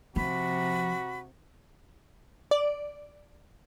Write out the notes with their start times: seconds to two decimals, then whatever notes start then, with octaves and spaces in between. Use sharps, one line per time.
0.16 C3 F3 F#4 B5
2.51 D5